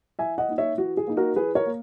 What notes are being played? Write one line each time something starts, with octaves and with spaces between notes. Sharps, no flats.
E3 E5 G#5
D#5 F#5
A#3 D#4
C#5 E5
E3 F#4
G#4
A#3 D#4
F#4 A#4
E3 G#4 B4
A#4 C#5
A#3